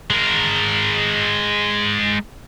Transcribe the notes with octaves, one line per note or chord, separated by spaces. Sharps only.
G#3 A#4